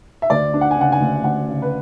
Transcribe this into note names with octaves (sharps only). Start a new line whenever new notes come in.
E5
D2 D5
D4
F#5
G#5
C#3 F#5
G#5
D2
D2 F#5
C#3
B4